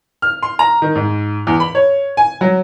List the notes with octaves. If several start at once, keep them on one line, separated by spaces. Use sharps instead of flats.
F6
C6
A#5
D#3
G#2
E2
B5
C#5
G#5
F#3